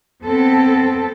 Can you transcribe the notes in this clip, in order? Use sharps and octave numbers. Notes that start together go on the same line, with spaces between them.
B3 C4 A4